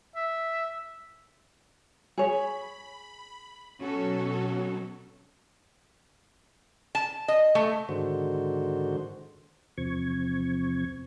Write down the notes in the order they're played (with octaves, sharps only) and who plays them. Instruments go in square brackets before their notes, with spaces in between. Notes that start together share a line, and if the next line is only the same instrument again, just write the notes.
[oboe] E5
[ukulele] G#4 C#5 [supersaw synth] B5
[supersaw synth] B2 F#3 [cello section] C#4 F#4 A4
[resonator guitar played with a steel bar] A5
D#5
A3
[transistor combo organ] G#2 D3 D#3 F#4 C5
[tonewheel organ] E2 C3 F3 C4 C#6 G#6